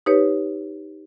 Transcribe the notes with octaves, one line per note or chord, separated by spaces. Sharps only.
D#4 G4 B4 C#5